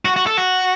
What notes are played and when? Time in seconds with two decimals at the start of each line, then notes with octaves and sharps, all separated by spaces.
0.05 F#4
0.16 F#4
0.27 A4
0.37 F#4